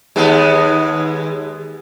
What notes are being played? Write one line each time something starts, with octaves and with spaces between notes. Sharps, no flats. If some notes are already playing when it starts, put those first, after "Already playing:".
D#2 G#3 B3